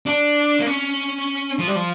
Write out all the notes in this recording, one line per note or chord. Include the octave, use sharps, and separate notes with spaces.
D4
A#3
C#4
F3
G3
F3